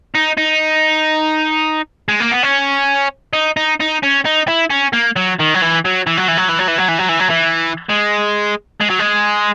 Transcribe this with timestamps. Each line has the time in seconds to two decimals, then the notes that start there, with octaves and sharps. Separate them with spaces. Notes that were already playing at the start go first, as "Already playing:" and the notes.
0.15 D#4
0.38 D#4
2.09 G#3
2.20 A#3
2.32 B3
2.43 C#4
3.33 D#4
3.57 D#4
3.80 D#4
4.03 C#4
4.25 D#4
4.48 E4
4.70 C#4
4.93 A#3
5.16 F#3
5.39 D#3
5.54 F#3
5.61 E3
5.85 F#3
6.07 E3
6.17 F#3
6.28 E3
6.38 F#3
6.49 E3
6.59 F#3
6.68 E3
6.78 F#3
6.88 E3
6.99 F#3
7.09 E3
7.20 F#3
7.30 E3
7.89 G#3
8.81 G#3
8.90 F#3
8.99 G#3